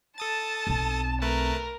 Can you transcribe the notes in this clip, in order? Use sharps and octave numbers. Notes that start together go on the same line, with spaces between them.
A4 A5 D#6 A6
B1 C4
A3 A#4 B4 A5